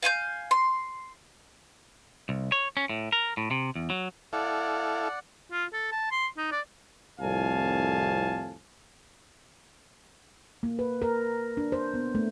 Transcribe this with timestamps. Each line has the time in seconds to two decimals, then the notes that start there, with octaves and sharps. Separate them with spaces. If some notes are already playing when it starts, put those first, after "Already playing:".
0.03 F5 G#5 C6 G6
0.51 C6
2.29 C2
2.52 C#5
2.77 C#4
2.90 A2
3.12 A#4
3.37 A2
3.51 C3
3.76 E2
3.90 F#3
4.33 E4 A4 D5 F5 F#5
5.52 F4
5.73 A4
5.92 A5
6.12 C6
6.37 D#4
6.52 D5
7.20 C2 F2 A2 F5 G#5 A5
10.63 A#3
10.79 B4
11.02 A#4
11.57 D4
11.72 C5
11.94 B3
12.15 A3